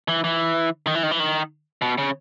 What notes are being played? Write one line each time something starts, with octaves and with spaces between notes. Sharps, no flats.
E3
E3
D#3
E3
D#3
E3
D#3
B2
C#3